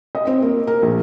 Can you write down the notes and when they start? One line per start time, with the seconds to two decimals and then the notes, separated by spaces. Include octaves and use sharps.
0.15 D#5
0.27 C4
0.42 A#3
0.67 A#4
0.82 A#1